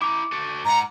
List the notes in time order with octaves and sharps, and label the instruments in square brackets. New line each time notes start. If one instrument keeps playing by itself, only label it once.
[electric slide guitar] E4 A#5 [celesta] D6
[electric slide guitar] F#4 A4
[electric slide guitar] G#2 F#5 [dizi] A#5